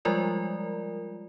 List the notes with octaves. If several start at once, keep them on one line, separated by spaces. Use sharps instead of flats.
F3 G3 G#3 F4 A#4 D5